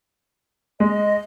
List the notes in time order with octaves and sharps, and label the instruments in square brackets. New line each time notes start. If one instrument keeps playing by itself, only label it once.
[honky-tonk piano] G#3 [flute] D#5